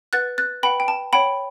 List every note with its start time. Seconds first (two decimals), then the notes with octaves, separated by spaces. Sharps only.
0.13 B4 F#5 F#6 A6
0.38 F#6 A6
0.63 B4 F#5 G5 B5
0.80 G5
0.88 A5
1.13 C#5 F#5 G5 B5